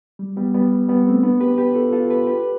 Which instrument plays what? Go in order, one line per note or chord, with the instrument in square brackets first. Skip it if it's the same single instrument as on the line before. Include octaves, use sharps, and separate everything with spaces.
[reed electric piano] G3
G3 B3
G3 B3
G3 B3
A3 C4
B3 D4
G4 B4
G4 B4
F4 A4
F4 A4
G4 B4
G4 B4